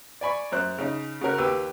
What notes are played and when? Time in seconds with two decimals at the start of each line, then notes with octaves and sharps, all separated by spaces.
0.21 D5 G#5 B5 C#6
0.52 F#2 C5 F#6
0.78 C#3 D#4
1.21 C#3 F#4 A#4 F#6
1.38 D#2 G4 B4 E6